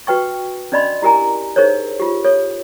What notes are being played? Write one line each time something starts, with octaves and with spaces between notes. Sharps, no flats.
F#4 B4 G5 C#6
C#4 D4 D5 D#5 B5 C6
E4 G4 A#4 G#5 A#5
D#4 G#4 A#4 C5 C#5
F4 G4
A4 C#5